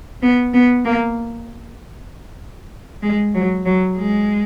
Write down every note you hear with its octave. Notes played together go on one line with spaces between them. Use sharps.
B3
B3
A#3
G#3
F#3
F#3
G#3